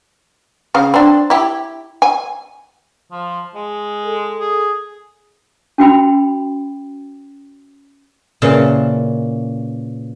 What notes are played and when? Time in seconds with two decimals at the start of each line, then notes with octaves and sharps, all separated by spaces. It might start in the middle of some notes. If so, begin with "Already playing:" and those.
0.74 C#3 F5
0.94 C4 D4
1.30 E4 G4
2.02 G#5
3.12 F3
3.55 G#3
4.06 A4
4.40 G#4
5.78 C#4 F#4 G5 B5
8.42 A#2 C#3 E3 A5